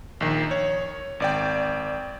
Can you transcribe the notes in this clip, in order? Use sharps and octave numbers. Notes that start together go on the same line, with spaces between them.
A#1 D#3
C#5
G#1 D5 G5